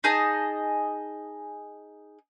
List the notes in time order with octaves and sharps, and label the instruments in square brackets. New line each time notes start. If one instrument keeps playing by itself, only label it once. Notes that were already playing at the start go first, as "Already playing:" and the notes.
[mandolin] D#4 G#4 D#5 A5